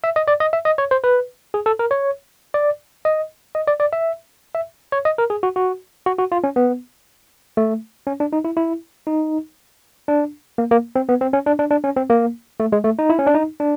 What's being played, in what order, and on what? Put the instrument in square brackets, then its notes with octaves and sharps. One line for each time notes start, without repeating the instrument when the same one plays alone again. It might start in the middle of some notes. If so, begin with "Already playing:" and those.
[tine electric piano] E5
D#5
D5
D#5
E5
D#5
C#5
C5
B4
G#4
A4
A#4
C#5
D5
D#5
D#5
D5
D5
E5
E5
C#5
D#5
A#4
G#4
F#4
F#4
F#4
F#4
F4
C#4
B3
A3
C#4
D4
D#4
E4
E4
D#4
D4
A#3
A#3
C4
B3
C4
C#4
D4
D4
D4
C#4
C4
A#3
A3
G#3
A3
D#4
E4
C#4
D4
D#4
D4